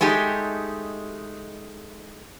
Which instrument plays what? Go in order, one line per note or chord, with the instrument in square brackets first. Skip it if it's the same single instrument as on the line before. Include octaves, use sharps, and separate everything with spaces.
[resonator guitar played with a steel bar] G#3 A3 D#4 G4